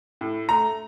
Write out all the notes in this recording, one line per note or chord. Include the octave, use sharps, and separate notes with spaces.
A2
A3 A#5